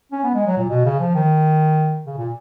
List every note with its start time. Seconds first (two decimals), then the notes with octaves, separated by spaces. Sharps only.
0.12 C#4
0.24 B3
0.34 G#3
0.47 F#3
0.58 A#2
0.69 B2
0.85 C#3
1.00 F3
1.15 D#3
2.06 C#3
2.18 A#2